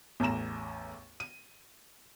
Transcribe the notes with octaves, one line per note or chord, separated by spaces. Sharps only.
A1 E2 A2 A#5 E7
D#7